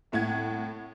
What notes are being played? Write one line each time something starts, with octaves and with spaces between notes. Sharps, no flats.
C2 A2 F#5 G#6